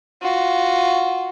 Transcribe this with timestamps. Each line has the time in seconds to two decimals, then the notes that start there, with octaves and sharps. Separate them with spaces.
0.22 F4 F#4